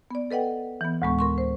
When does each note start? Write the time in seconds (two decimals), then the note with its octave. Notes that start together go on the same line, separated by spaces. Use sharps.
0.11 B3 D5
0.31 A4 B4 D#5 F#5 G5
0.81 E3 B3
1.02 D2 A2 G#3 B3 C#6
1.19 A#4 C6 C#6
1.38 C5